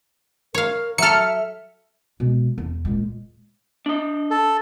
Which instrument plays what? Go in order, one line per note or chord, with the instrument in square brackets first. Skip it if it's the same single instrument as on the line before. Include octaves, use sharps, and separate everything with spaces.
[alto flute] A#4 [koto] C#5 F5
[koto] F#3 A4 [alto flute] E5 [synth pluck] F6 C#7
[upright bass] B2 G#3
E2
A#2 G#3
[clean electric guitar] D4 D#5
[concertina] A4